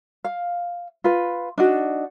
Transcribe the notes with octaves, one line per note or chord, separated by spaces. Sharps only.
F5
F4 B4
D4 D#4 F#4